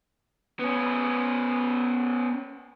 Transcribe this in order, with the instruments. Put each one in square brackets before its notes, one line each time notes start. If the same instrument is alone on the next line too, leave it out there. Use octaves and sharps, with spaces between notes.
[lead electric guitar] B3 C#4